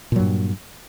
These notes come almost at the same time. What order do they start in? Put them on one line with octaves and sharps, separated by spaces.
A#2 F#3 G2